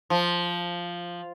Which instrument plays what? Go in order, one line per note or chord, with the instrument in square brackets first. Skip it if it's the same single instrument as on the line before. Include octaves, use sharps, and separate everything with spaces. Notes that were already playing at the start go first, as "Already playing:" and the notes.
[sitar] F3